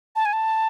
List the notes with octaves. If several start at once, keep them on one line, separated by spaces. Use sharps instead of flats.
A5
G#5
A5